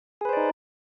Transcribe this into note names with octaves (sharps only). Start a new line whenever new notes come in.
D#4 G#4 B4 C5 D5